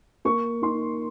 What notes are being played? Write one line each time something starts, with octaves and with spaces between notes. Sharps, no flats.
A#3 C#6
D#4 C6